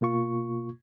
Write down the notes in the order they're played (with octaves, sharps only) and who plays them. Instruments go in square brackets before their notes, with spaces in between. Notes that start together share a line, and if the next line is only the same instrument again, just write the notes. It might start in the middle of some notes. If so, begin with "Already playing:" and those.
[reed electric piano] B2 A#3 F4 C#6